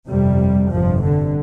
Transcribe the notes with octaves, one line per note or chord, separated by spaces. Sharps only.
G1 F2 C3 G3
G1 F2 C3 F3
D3